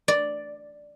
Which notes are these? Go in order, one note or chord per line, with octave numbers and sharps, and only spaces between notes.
D5